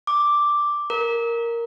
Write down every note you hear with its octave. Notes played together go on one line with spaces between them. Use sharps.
D6
A#4